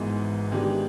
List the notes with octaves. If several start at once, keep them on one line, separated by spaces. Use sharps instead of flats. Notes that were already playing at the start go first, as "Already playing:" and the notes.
Already playing: G#1 G#2 E3 G#3 B3
D#3 G#3 B3 D4 G4